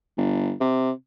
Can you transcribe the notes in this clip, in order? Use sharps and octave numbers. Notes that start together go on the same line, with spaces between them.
G1
C3